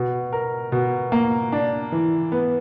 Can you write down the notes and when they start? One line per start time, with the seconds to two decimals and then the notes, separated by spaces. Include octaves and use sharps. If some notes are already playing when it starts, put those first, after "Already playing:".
Already playing: B2
0.33 A#4
0.72 B2
1.12 A#3
1.52 D4
1.92 E3
2.32 B3